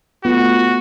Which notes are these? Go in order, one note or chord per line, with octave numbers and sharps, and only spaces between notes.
A3 B3 F4 F#4